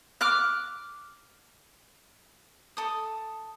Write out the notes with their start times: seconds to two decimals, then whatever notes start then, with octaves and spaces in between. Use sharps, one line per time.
0.21 D6 F6 F#6
2.77 A4 D#6